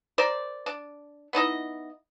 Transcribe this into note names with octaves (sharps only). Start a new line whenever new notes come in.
A#4 C5 D5
D4
B3 D#4 E4 D#5